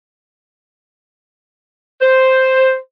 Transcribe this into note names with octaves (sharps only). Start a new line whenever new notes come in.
C5